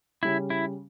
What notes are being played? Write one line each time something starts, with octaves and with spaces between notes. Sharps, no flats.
C#3 G3 C#4 E4
E4